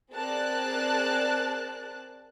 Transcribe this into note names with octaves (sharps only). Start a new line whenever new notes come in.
C4 G#4 A#4 D5 A5 F#6